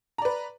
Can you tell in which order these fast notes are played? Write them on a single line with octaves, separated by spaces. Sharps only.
A#5 D5 B4